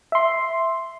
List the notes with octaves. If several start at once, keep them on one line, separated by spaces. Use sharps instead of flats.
E5 C6